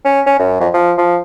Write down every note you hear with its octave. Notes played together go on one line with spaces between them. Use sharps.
C#4
C#4
F#2
F2
F3
F3